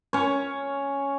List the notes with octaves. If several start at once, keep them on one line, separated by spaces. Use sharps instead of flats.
C#4 C#5